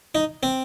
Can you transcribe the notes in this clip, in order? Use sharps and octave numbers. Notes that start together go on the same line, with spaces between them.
D#4
C4